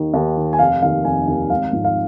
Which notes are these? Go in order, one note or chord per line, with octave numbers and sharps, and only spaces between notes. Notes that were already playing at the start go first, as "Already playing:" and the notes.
Already playing: D#2 D#3
D#2
D#3
G#5
F1 F5
D#2 D#3 F5
F1 G#5
D#2 D#3
G#1 F5
G#2 F3
F5